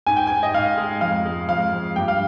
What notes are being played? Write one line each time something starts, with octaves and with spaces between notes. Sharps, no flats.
G#2 G#5
G5
G#2 G#5
D#5
G#2 F5
G#3
F2 F5
G#3
F2 F5
F2
G2 G5
F5